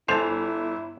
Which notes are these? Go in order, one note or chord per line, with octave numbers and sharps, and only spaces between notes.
G1 E4 A4 C5 G#5 A5 F7